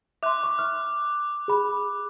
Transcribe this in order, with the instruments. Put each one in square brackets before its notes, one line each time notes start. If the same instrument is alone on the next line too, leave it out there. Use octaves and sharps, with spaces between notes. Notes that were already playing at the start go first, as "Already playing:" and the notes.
[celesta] E5 C6 [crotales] D6 F#6
[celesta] C#6
F6
G#4 B5